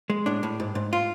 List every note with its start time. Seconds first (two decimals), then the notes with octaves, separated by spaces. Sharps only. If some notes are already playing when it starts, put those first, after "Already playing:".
0.10 G#3
0.26 A2 D4
0.43 A2
0.60 G#2
0.75 G#2
0.93 F4